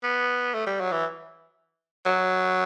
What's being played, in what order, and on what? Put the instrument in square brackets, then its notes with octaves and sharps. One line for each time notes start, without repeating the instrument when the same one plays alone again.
[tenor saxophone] B3
A3
G3
F#3
E3
F#3